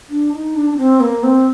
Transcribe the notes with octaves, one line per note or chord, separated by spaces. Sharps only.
D4
D#4
D4
D4
C4
A#3
C4